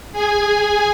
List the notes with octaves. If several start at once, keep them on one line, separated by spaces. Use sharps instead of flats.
G#4 G#5